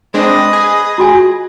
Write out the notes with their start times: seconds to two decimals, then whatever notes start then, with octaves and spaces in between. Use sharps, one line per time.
0.14 G#3 C4 D4 B4 D#5
0.53 G#4
0.98 F4 F#4 G#5